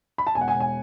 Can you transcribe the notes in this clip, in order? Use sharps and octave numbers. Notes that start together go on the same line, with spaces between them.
B5
A5
E1 G#5
F#5
G#5
E1
G#5